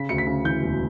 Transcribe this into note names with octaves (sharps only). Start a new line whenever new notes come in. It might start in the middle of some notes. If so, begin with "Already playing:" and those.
Already playing: C#3 B6
D2 C#7
B6
C#3
E3 G6
E1